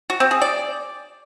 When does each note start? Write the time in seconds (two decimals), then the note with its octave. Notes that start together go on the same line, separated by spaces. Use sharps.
0.10 F#4
0.20 C4
0.31 G#4
0.41 D5